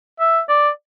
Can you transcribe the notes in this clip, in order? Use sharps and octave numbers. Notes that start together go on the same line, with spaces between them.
E5
D5